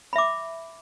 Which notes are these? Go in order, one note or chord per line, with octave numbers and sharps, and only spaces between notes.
E5 B5 D6